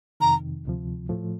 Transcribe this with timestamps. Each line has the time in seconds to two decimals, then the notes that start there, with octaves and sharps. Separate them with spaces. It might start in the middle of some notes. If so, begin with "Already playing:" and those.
0.20 F2 C3 D#3 A#5
0.65 D2 C3 F3
1.09 A2 F3 A3